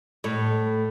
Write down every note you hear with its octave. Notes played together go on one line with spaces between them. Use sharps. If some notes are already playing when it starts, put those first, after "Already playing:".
A2